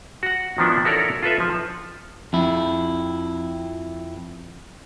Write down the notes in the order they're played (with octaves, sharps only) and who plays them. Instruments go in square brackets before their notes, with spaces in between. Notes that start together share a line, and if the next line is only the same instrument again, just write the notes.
[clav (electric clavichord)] F#4 F#5
D#3 F3 B3 D4 E4
E4 F#4 A4 A#4 C#5 D5
F4 A4 B4 E5
F3
[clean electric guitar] F2 E4